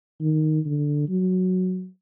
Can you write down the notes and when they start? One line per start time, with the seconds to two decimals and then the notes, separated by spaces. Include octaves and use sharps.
0.21 D#3
0.65 D3
1.09 F#3